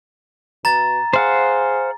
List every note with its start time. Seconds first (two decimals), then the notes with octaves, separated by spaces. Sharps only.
0.65 B2 A#5 A6
1.13 G#4 C5 F5 F#5